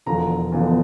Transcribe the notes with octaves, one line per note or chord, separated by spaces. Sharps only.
E1 E2 D3 F3 A#5
E1 E2 D3 F3